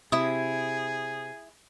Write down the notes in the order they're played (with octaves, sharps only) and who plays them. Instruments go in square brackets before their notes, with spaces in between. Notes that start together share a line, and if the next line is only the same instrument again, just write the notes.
[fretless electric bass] C3 [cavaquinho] E4 D#6 [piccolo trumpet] G#4